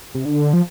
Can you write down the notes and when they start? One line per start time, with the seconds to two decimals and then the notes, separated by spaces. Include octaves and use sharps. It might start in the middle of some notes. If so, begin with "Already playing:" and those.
0.15 C3
0.25 D3
0.53 F3